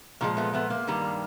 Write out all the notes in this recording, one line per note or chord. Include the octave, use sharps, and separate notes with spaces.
A#2 F3 G#3 A#3
A3 B3
A3 B3
A#3
G2 D#3 G3